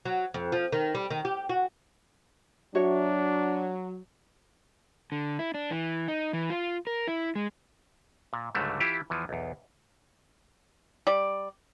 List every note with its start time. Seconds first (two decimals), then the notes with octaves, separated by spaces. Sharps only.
0.05 F#3
0.34 F2
0.52 F3
0.72 D#3
0.95 G3
1.11 D#3
1.25 G4
1.49 F#4
2.75 F#3 D4 F#4 C#5 E5
5.12 D3
5.39 E4
5.54 D4
5.71 E3
6.08 D#4
6.33 E3
6.50 F4
6.87 A#4
7.08 E4
7.35 G#3
8.33 A#2
8.55 C#2 G#2 D3 F#3 G3 A3
8.80 E3 E4 F4 G4
9.10 E2 E3 F3
9.29 B1 E2
11.07 G3 D5